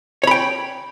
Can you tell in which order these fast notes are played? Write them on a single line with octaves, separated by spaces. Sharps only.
C#5 B5 G5